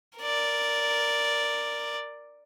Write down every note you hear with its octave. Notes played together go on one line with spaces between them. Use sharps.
A#4 D5